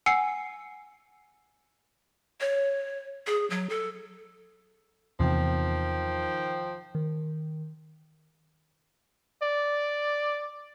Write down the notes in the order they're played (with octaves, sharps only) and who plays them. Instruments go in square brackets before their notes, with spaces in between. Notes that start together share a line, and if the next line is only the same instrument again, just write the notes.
[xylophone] F#5 G#5 E6 C7 C#7
[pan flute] C#5
G#4
F#3
A4
[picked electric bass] E2 C3 [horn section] D#3 F3 G5
[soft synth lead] D#3
[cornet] D5